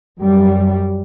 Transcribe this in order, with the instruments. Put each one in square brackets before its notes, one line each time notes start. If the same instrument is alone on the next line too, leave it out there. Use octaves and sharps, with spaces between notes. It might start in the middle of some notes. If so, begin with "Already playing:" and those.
[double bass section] F#2 G3